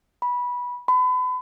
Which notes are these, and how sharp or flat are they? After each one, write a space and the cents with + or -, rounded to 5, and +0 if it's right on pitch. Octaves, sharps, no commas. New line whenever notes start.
B5 -15
B5 +35